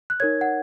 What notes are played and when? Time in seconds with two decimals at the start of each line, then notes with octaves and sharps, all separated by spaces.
0.10 F#6
0.20 D#4 A#4 C#5 G#6
0.41 F#5